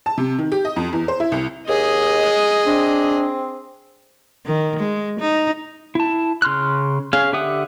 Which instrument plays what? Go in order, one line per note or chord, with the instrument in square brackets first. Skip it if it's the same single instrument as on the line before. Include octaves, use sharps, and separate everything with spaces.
[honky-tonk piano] A5
C3
D#3
G4
D#5
F2
E2
C5
E4
C2
[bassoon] D#2 [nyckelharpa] G#4 [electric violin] D#5
[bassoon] C4 [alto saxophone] D4
[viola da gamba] D#3
G#3
D#4
[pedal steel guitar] E4 A5
C#3 C6 F6 F#6
C#4 G#4 F5
D3 G4 E5 F#5 D#6